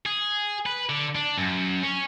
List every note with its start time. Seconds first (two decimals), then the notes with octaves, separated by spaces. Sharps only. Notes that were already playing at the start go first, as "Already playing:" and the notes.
0.06 G#4
0.66 B4
0.90 D3
1.15 D4
1.38 F#2
1.82 C#4